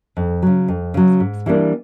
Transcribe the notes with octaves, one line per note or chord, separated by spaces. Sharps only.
F2
C#3 F#3
F2
C#3 F#3
G#2
E3 G3 A#3 D4